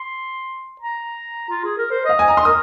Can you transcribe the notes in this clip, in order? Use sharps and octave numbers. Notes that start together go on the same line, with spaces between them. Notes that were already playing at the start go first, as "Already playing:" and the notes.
Already playing: C6
A#5
F4
G#4
A#4
C5
D#5 F5
G#5
A#5
C6
A#4 D#6